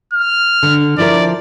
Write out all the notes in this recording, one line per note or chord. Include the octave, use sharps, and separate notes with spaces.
F6
D3 D4
F3 E4 A#4 D5